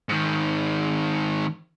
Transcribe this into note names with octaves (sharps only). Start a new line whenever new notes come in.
G#2 D#3